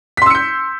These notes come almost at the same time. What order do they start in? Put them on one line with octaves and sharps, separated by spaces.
B6 C6 E6 C#7 G6